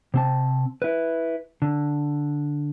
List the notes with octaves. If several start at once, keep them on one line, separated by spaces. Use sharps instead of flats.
C3 C4 A5
E4 B4
D3